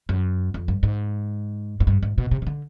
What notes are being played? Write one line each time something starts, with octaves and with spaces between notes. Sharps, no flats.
F#2
F2
G2
G#2
G#2
G2
G#2
B2
C3
C#3
D3